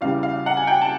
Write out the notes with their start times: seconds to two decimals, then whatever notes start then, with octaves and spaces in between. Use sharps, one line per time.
0.01 E2 C#3 E3 G3 F5
0.23 F5
0.46 F#5
0.57 G#5
0.67 G5
0.81 A5